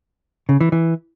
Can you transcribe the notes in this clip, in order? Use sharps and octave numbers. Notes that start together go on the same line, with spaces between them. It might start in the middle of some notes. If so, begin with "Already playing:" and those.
C#3
E3
E3